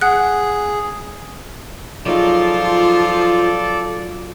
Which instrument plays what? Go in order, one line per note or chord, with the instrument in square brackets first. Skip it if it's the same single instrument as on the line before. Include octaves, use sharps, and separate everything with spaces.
[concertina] G#4 [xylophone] F#5 F#6
[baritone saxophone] F3 [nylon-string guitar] F#3 D#4 G#4 [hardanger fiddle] F4 [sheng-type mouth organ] A4 D5